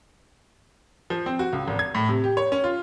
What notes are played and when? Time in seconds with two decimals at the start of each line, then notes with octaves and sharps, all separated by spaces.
1.10 F3
1.26 C4
1.39 F#4
1.53 C#2
1.68 G#1
1.79 G#6
1.95 A2
2.09 C3
2.24 G4
2.37 C#5
2.52 C#4
2.64 F4